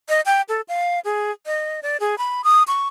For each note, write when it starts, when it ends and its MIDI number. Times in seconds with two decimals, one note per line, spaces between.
0.09 0.21 75
0.26 0.42 79
0.49 0.61 69
0.68 1.00 77
1.05 1.31 68
1.46 1.80 75
1.83 1.97 74
2.00 2.18 68
2.18 2.44 83
2.44 2.63 87
2.67 2.88 85